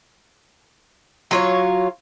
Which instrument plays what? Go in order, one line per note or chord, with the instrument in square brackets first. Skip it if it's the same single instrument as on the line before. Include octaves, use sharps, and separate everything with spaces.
[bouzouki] F#3 F4 C#5